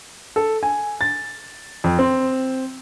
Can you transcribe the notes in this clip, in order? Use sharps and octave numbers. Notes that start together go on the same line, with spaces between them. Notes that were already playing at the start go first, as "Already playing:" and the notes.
A4
G#5
A6
F2
C4